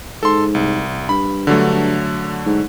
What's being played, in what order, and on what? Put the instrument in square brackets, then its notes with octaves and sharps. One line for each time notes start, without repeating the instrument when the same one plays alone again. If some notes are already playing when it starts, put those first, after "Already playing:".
[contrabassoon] G#2 [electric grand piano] A4 C6
[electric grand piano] C2
[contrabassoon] G2 [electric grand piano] B5
[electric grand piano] D3 F#3 A3
[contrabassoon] G#2